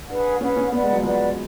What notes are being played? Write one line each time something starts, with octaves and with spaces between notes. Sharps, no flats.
D4 G#4 B4 F#5
C#4 G#4 B4 F#5
C#4
B3 B4 D5 F#5
G#3
F#3
F3 B4 D5 F#5